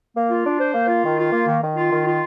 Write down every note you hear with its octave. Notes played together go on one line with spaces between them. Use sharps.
A#3
F4
D4
C5
A#3
F4
D#3
F4
A#3
D#3
D#3
F4
D#3
F4